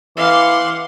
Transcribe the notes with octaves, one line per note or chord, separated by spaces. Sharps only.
E3 F5 F#5 C6 D6